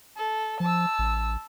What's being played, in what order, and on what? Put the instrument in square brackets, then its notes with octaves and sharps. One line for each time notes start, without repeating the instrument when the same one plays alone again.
[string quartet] A4
[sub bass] F3 [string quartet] A5 E6
[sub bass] A1